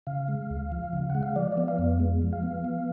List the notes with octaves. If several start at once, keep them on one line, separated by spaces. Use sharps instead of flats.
C#3 F5
G#3
D2
F3
C#3
F#5
G#3
F5
F3 D5
D5
B3
F5
F2
G#3
F3
F5
B3
F3